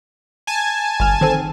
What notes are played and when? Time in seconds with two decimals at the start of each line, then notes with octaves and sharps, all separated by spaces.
0.47 G#5 A5
1.00 G1 F6
1.21 D#3 C4 A4